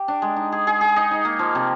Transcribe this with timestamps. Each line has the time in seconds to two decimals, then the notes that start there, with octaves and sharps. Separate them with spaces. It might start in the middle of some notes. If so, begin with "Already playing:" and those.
Already playing: G4
0.08 D4
0.22 G#3
0.36 D#4
0.52 G#4
0.67 G#4
0.81 G#4
0.96 D#4
1.11 D#4
1.25 A#3
1.39 F3
1.55 C3